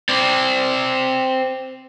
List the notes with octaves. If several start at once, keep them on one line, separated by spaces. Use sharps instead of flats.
C4 D5